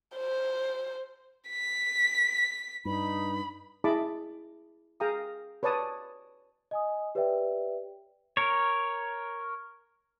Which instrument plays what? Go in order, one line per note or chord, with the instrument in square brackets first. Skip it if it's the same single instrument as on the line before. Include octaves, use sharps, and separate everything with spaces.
[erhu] C5
[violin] B6
[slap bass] G2 [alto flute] D#4 [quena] B5
[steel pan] E4 G#4 D#5 A5 B5 D6
G#4 F5 G5 A#5 D#6
B4 C#5 D5 A5 D#6
[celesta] D#5 G#5 D#6
G4 B4 C#5 D5 E5 G5
[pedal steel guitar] A#4 C#5